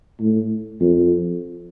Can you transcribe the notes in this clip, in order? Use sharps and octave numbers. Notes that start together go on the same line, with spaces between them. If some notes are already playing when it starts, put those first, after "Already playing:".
A2
F2